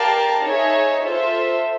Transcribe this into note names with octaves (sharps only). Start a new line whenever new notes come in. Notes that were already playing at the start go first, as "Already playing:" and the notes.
Already playing: G4 A#4 D5 F5 A5
D#4 G#4 C#5 E5
F4 A4 C5 E5